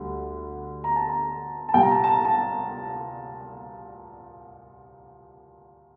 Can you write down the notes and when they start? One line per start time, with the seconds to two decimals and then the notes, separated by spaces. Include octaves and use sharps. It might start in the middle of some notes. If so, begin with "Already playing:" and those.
Already playing: D2 D3 G3
0.84 A#5
0.96 A5
1.09 A#5
1.69 A5
1.74 C2 A#2 G3 G5
1.82 A#5
1.91 A5
2.04 A5
2.09 A#5
2.25 A5